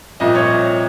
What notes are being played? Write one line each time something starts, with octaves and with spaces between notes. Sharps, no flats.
C2 A#2 F3 D#5
C#5